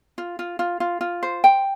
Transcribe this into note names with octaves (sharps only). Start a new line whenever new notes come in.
F4
F4
F4
F4
F4
C5
G5